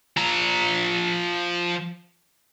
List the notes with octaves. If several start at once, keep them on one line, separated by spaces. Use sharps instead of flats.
F3 A#5